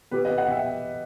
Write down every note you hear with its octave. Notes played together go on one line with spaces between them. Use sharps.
B2 G4 B4
B2 B4 D#5
D#5 F#5
B2 E5 G5